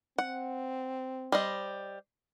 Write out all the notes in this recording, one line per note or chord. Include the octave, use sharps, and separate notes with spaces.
C4 F#5
G3 C5 D#5